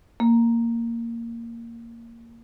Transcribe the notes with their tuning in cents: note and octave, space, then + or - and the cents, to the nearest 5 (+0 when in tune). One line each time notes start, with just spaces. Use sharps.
A#3 -10